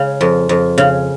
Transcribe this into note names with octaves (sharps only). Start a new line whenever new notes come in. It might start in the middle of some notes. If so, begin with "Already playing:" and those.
Already playing: C#3 G#3
F2
F2
C#3